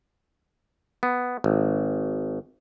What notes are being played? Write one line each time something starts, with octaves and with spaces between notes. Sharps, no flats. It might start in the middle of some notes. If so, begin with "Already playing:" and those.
B3
G#1